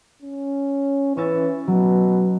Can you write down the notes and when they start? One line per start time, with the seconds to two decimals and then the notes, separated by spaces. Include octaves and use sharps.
0.23 C#4
1.17 E3 C#4 E5 A6
1.68 B2 F#3